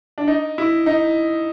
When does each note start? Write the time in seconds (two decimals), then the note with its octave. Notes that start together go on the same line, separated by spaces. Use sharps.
0.18 D4
0.28 D#4
0.58 E4
0.86 D#4